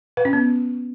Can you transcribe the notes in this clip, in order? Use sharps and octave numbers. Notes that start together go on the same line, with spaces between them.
B4
C#4
B3